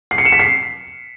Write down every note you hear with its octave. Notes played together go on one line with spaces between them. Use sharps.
C7
C#7
E7
B6
C7